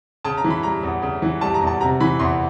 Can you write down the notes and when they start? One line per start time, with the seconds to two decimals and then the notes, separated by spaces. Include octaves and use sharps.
0.24 C#3 A5
0.37 A#5
0.44 E3
0.50 B5
0.63 G3 A#5
0.83 E2
1.02 C#3
1.22 E3
1.41 G3 A5
1.54 A#5
1.61 E2
1.67 A5
1.81 C3 A#5
2.00 E3 B5
2.19 E2 C6